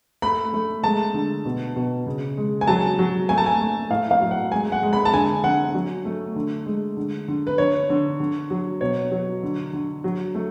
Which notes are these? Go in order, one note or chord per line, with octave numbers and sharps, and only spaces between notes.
A3 B5
A3
G#3 A5
D3
B2
B2
C#3
G#3
G#5
F#3 A5
F#3
A3 G#5
A5
G#5
A3
A2 F5
F5
F#3
F#5
G#3 G#5
F#5
G#3
B5
A5
D3 G#5
D3 F#5
F#3
A3
D3
G#3
D3
D3
B4
D3 C#5
D3
D3
F#3
B2 C#5
F#3
D3
D3
F#3
A3